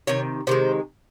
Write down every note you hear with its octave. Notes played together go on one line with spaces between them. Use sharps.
C3 D#3 C#5
C3 D#3 G#3 C5